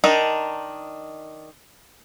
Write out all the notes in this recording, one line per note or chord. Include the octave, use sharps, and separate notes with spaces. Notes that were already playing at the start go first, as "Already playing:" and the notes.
D#3 D4 D#4